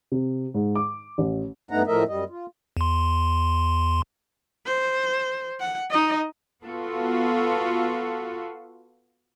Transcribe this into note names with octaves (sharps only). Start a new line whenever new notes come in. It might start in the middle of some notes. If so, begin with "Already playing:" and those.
C3
G#2
D6
A1
G2 A3 B3 D#4 F#5 A#5
A2 F3 A3 A#4 D#5 E5
F#2 G3 D#5
F4
E2 C6
C5
F#5
D#4 D#5
B3 F4 F#4 A4